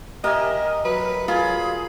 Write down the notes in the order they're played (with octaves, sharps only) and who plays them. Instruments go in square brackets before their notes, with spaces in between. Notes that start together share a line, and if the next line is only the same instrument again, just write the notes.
[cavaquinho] G4 E5 G#5 [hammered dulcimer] A#4 [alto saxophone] D#5
[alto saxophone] F#3 [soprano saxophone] B4
[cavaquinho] F4 [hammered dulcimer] G#4 [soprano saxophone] B5